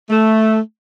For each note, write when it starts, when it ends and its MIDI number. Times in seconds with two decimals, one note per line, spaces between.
0.10 0.58 57